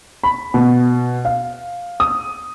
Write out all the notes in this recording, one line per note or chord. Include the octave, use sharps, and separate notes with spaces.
B5
B2
F5
D#6